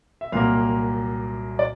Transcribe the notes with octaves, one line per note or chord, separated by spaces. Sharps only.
E5
C2 A#2 F#3 A#3 F5
D5